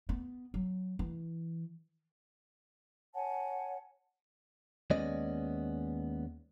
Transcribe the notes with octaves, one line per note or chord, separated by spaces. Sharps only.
B3
F#3
E3
C#5 F#5 G#5 A5
D#2 G#3 B3 C#4 D5 D#5